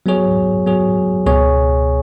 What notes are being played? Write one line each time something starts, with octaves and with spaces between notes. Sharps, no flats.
F#3 B3 G#4 C#5
F#3 B3 G#4 C#5
C#2 B2 B3 G#4 C#5